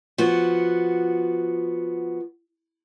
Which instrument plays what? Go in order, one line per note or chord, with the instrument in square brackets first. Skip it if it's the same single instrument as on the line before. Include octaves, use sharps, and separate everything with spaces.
[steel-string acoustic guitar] F3 B3 F#4